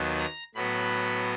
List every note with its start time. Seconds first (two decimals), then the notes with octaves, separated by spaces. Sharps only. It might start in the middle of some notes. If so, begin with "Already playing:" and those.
Already playing: D#2 D#3 F#3 B3
0.18 A#5
0.55 A2 F#3 B3 B5